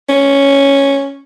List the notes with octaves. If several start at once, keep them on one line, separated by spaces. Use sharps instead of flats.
C#4